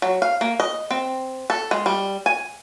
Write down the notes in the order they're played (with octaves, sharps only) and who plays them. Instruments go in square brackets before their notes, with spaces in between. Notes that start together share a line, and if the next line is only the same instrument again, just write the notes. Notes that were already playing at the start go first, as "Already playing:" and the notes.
[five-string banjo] F#3
F5
A#3
D#5
C4
A4
G#3
G3
G#5